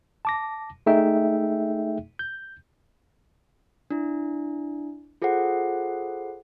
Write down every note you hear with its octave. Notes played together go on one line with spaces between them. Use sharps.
A5 D6 A#6
A3 D#4 G#4 E5 G5
G6
D4 E4
F4 G#4 A4 C5 F#5